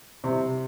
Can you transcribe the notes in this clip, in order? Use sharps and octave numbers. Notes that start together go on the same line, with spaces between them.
C3